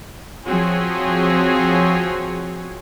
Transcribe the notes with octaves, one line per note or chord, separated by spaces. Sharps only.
F3 C4 F#4 G#4 C#5